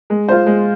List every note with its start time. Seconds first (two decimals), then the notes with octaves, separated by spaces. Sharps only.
0.10 G#3
0.29 F4 C5
0.47 G#3